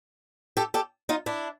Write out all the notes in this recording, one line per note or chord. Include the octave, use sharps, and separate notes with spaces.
G4 A4
G4 A4
D#4 F4
D4 E4